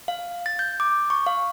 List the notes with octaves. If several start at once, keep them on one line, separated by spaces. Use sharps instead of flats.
F5
A6
G6
D6
C#6
F5